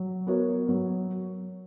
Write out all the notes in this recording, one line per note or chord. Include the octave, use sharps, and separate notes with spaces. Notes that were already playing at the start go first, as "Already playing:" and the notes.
Already playing: F#3
B3 F#4 A#4 C#5
F#3